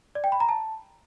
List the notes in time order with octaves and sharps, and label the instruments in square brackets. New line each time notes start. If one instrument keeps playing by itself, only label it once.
[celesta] D5
G5
B5
A#5
A5